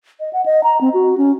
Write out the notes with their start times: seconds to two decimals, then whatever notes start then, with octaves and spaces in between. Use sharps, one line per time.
0.20 D#5
0.33 F#5
0.46 D#5
0.64 A#5
0.81 C4
0.94 F#4
1.18 C#4